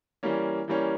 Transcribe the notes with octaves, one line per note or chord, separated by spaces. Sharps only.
E3 G3 A#3 C#4
E3 G3 A#3 C#4